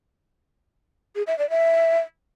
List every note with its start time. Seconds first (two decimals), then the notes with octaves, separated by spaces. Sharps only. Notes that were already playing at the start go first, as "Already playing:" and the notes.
1.16 G#4
1.27 E5
1.39 D5
1.50 E5